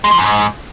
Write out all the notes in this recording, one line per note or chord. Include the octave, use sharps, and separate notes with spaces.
G#3
F3
F#2
G#2